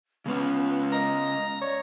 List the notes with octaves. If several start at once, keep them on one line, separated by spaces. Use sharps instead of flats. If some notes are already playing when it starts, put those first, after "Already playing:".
C#3 G#3 B3 C#4
D#5 A#5
C#5 D5